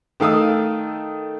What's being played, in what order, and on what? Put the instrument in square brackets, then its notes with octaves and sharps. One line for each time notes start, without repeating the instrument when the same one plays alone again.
[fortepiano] D#3 A3 F5 D#6 E6